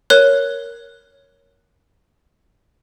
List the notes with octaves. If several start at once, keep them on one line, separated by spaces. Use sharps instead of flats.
A#4 C#5 F#6